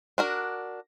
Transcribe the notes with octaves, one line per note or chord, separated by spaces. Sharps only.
D4 F#4 A#4